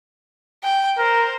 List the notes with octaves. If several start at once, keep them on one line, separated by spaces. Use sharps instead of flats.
G5
A#4 C5